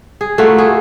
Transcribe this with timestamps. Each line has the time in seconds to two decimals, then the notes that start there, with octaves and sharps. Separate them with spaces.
0.21 G#4
0.38 A3 A#3 F4 F#4
0.58 G#4